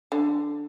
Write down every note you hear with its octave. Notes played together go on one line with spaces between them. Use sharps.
D3